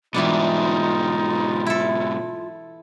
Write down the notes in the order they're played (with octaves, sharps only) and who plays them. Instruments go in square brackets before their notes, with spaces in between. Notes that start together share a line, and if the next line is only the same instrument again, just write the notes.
[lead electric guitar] G#2 B2 [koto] E3 G3 D4 [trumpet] D#4 [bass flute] F4
[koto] E4 A4